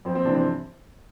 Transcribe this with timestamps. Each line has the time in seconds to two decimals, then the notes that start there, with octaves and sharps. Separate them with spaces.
0.05 F2 C4
0.15 C4
0.25 C3 E3 D4
0.35 C4